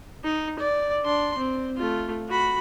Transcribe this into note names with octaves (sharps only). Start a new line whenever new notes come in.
D#4
D5
D4 C6
C4
A3 F4
F#4 B5